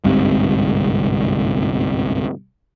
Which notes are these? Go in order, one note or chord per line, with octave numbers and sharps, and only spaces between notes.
G1 C2 G#2 C3